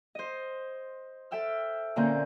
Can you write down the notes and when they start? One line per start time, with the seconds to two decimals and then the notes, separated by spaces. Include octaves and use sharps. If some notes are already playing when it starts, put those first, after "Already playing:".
0.15 C5 D#5
1.31 A4 E5 G5 E6 F6
1.96 A#2 D3 A#3 C4 C#4 G6